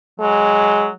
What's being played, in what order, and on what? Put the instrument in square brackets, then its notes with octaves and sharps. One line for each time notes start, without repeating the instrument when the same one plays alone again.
[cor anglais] F#3 [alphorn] G#3